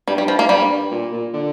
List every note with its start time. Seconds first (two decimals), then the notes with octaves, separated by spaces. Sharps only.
0.07 G2 G3
0.18 G3
0.28 F3
0.39 A#3
0.49 G2 G3
0.92 A#2
1.13 A#2
1.33 D3